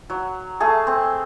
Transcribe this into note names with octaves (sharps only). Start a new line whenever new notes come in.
F#3
A3 G#4 A5
C4